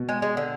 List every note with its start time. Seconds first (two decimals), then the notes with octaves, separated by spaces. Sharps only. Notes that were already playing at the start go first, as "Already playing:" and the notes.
Already playing: B2
0.09 G#3
0.22 G#3
0.37 D3